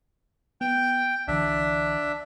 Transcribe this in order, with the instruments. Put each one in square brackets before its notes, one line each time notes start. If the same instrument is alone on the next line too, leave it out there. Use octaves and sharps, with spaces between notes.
[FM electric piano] B3 [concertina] G5
[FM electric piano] C2 D3 E3 [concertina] D4 E5